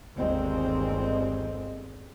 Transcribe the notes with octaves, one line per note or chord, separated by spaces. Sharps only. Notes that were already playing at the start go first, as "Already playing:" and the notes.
G1 D#2 G#3 C4